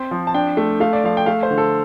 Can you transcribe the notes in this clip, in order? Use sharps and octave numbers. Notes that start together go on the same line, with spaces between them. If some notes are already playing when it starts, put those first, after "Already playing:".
Already playing: C4
F3
A5
D4 G5
A3
A3 F5
D5
F3 F5
G5
A3 F5
C5
D3
A4